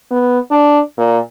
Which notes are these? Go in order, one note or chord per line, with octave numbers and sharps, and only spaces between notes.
B3
D4
A#2